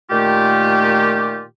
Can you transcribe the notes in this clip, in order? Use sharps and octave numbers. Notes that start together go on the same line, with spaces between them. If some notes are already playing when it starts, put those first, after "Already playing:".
A#2 D#3 A3 F4 G4